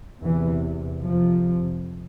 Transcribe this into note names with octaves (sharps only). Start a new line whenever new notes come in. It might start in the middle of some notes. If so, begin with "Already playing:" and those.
E2 C3 E3
F2 C3 F3